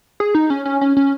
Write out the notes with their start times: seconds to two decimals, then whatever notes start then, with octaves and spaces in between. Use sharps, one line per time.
0.20 G#4
0.35 D#4
0.50 C#4
0.65 C#4
0.81 C#4
0.97 C#4